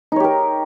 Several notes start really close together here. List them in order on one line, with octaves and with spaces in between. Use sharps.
D#4 C#5 G4 A#4